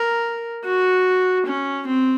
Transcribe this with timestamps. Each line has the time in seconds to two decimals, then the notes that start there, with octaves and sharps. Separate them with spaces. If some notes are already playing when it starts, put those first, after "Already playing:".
Already playing: A#4
0.64 F#4
1.46 C#4
1.87 C4